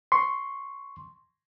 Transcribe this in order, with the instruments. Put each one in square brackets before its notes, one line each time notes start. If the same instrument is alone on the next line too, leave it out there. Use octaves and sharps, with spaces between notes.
[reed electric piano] C6 C#6